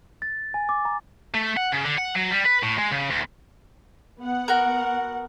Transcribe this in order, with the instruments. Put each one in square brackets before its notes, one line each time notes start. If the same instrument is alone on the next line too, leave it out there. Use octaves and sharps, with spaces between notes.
[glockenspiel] A6
G#5
D6
A#5
[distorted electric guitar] A3
F#5
C#3
D3
F#5
F#3
G3
B4
A2
G#3
C#3
D2
[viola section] B3 F#5
[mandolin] F#4 A#4